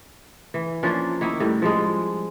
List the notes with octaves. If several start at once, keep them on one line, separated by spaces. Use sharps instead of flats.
E3
F3 A#3 C#4 D4
D#3 A#3 E4
A2 G3
F3 G3 G#3